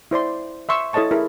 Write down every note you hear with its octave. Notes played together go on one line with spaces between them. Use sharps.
E4 C5 D5 C6
E5 C6 C#6 E6
E4 A4 C#5 D#5 A5 C#6
E4 G#4 A#4